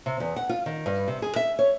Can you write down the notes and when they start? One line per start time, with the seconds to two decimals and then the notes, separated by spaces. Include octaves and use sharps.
0.06 C3
0.20 E2
0.36 F#5
0.49 F4
0.66 D#3
0.86 G2
1.08 C3
1.22 G#4
1.36 E5
1.59 C#5